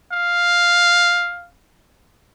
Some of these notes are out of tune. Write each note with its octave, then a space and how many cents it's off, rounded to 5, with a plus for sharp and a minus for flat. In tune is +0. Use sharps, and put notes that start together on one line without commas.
F5 +5